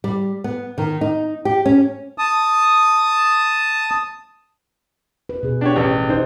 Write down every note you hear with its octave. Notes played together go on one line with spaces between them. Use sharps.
G3
B3
D#3
D#4
G4
C#4
A5 D#6
B4
B2 G#4
D4 G4 C#5
A1 G4 B4
D#4 C5